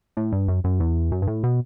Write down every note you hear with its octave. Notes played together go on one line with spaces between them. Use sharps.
A2
G2
F#2
F#2
E2
F#2
G2
A2
B2